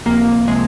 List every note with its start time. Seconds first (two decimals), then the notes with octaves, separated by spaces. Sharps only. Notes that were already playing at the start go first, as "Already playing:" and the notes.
0.06 C#2 C3 F3 A#3
0.48 C3 F3 G#3